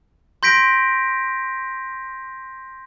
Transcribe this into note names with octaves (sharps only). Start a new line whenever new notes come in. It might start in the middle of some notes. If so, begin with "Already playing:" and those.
C6 G6 A#6 B6 D7